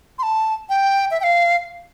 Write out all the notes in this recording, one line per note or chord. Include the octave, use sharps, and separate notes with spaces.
C6
A5
G5
E5
G5
F5